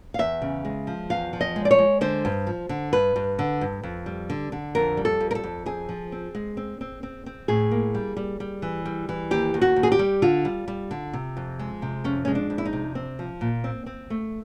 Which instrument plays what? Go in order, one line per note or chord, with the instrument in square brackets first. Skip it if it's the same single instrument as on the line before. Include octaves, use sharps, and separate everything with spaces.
[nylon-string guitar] F5
E2 E5
C#3
G#3
F3
E2 F5
F3
D#5
G#3
D5
C#5
G#3
D3 C5
G2
F3
D3
G2 B4
G2
D3
G2
F2
G3
D3
D3
F2 A#4
G3
A4
F2
A#4
A4
F2
C4 G#4
F3
C4
G#3
C4
C4
C4
C4
A2 G#4
A#3
G3
G3
G3
E3
G3
E3
D#2 G4
D#2
F#4
D#2
G#4
G4
G3
D3 F4
G3
G3
D3
C3
F2
G#3
C3
F2 C#4
G#3 C#4
D4
F2
E4
D#4
C3
C4
F3
A#2
C4
C4
A3